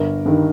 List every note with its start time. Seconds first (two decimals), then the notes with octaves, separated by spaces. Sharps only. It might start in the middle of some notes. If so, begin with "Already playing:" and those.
Already playing: G1 A#4
0.26 G2 D#3